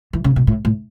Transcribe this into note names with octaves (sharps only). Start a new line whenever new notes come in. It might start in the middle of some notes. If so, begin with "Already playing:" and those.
E3
C#3
B2
A2
A2